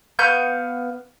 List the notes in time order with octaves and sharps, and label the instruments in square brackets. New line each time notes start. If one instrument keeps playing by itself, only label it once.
[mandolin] B3 F5 C#6 G6